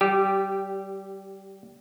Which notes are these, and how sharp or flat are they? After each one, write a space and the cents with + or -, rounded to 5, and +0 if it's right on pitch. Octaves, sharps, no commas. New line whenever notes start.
G3 -25 G4 +0